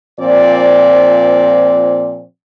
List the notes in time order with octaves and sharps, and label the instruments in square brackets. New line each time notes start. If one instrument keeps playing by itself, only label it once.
[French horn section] A#2 F3 C4 D5